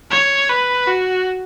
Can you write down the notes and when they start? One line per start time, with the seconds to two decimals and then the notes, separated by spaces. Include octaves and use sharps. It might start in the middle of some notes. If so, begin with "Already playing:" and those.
0.11 C#5
0.50 B4
0.87 F#4